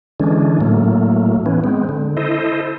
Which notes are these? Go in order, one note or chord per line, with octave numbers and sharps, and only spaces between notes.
D3 E3 G#3 C#4 D4
A2 F#3 A3 A#3
E3 B3 C#4
G#3 B3 C4
D3
E4 A4 C5 D#5